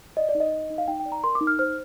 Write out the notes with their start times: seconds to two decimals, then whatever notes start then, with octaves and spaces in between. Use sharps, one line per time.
0.17 D5 D#5
0.29 D5
0.35 D#4
0.40 D#5
0.52 D#4
0.70 D#4
0.78 F5
0.88 D#4 G5
1.00 G5
1.06 D5
1.12 A#5
1.24 A#4 C6
1.35 D6
1.41 D#4
1.47 F6
1.59 C5 F6